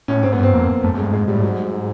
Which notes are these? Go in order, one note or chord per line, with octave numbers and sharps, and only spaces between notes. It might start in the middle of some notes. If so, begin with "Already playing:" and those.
A2 C#4
G#2 C4
B3
G2 C4
F2 A#3
F#2 A3
F#2 G#3
G2
G#2 G#3
G#2 G3
A2
G#2 F#3